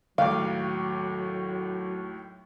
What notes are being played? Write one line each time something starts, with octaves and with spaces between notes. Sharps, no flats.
D#2 A2 F#3 F5 D6